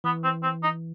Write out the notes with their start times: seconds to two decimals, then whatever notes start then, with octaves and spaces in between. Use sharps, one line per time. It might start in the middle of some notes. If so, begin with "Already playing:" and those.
0.04 E3 B3
0.24 C4
0.43 C4
0.63 D#4